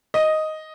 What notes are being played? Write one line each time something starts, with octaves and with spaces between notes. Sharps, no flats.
D#5